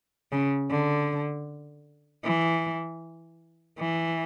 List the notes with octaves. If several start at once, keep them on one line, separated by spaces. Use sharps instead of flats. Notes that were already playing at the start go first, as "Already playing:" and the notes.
C#3
D3
E3
E3